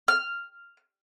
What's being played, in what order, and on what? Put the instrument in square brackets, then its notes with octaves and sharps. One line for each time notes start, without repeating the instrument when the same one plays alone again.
[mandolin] F6